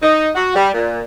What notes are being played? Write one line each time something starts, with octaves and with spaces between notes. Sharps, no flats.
D#4
F#4
G3
A#2